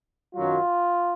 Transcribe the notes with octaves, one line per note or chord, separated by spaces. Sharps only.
F#2 D#3 F#3 F4